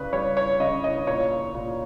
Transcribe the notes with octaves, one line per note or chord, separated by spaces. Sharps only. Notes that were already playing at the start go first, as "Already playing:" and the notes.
Already playing: C#3 G3 B4
G3 C#5
C#5
C#3 D#5
D#5
A#2 C#5
A#2